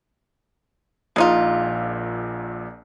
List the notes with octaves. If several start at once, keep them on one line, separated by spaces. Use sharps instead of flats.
A#1 A#2 G#3 D#4 F4